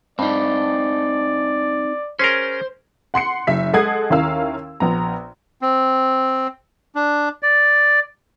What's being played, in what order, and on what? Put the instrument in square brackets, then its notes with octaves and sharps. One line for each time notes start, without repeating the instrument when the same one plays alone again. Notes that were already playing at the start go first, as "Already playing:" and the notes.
[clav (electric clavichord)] G2 [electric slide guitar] C4 D#4 [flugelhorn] D5
[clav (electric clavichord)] C#4 G#4 A#4 [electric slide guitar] C5
[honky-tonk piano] F#5 C6 C7 C#7
F#1 E5 B6
G#3 A4 F#5 D#6 G#6 C7
D#2 C#4 E4 A#4 F5 E6
A#1 B3 A#5
[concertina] C4
D4
D5